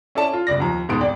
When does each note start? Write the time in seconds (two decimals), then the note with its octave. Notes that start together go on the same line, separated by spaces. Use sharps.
0.15 C#4 E4 A4 D5 A5
0.33 F4
0.47 G1 C#2 D5 A#6
0.60 D#2 F3 A#5
0.89 D#1 G#2 B3 C6 D#6 D7
1.01 G#1 D5 G5